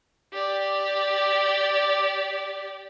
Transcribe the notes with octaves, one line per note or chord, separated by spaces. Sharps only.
G4 D5